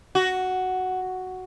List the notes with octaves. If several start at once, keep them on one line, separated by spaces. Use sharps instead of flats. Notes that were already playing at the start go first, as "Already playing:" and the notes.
F#4